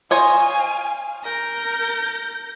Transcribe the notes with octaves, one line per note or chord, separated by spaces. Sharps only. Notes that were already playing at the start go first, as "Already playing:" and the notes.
C5 C#5 D#5 F5 G#5
A#4 G6 A#6